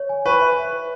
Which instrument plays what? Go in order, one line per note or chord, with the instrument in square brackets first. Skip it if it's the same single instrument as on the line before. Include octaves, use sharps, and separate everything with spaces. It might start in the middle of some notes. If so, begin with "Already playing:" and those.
Already playing: [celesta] C#5
G#5
[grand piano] B4 [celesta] C#6
[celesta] E5